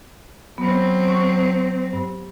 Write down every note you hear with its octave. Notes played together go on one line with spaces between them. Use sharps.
F#3 B3 C4
C#6
G2